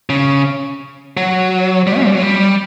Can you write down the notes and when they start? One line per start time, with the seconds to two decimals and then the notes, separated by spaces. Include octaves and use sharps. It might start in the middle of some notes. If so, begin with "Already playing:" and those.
0.10 C#3
1.17 F#3
1.87 G3
1.97 C#4
2.06 G3
2.14 F#3
2.22 G3